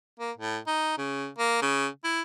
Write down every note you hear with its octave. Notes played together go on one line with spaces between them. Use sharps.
A#3
A2
D#4
C#3
A#3
C#3
E4